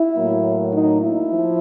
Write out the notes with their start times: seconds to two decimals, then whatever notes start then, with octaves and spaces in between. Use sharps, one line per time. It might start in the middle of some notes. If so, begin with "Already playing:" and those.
Already playing: E4
0.14 A2 F#3 A#3
0.72 D#4
1.02 E4
1.30 F3